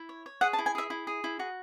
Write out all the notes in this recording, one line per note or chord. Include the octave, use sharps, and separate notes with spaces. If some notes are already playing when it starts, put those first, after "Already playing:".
Already playing: E4
C#5
C#5
G#4 F#5
A5
E4
G#5
G#4 E5
E4
G#4
E4
F#4